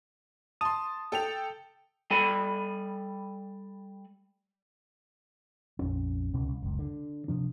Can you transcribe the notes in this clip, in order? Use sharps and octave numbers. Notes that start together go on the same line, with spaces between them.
A5 C6 D#6
A4 G5 F7
G3 A4 D5 G#5 B5
A#1 F2 C#4
C#2 B2 C#4
C2
F#1 C#2
D3
C3 F3 D4